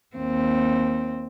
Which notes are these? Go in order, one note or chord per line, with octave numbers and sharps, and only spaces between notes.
D#2 C4